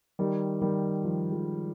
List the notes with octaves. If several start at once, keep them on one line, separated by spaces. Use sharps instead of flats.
D#3 G3
D#3 G3
F3
F3 G#3